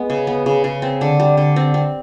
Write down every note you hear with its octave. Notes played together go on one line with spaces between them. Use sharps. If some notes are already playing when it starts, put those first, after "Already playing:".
Already playing: G#3 B3
C#3
B3
C#3
C#3
C4
D3
G3
D3
C4
C4